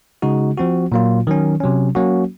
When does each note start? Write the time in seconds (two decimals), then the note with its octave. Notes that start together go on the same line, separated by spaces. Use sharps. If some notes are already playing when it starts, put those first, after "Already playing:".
0.22 C#3 G#3 D#4 F#4
0.58 F3 C4 F#4
0.92 A#2 F#3 A#3 F4
1.27 D#3 F#3 C#4
1.60 C3 F#3 C#4
1.95 F#3 A#3 C#4 F#4